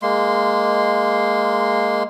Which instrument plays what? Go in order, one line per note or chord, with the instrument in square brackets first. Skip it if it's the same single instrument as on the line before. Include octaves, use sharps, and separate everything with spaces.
[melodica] G#3 A#3 C6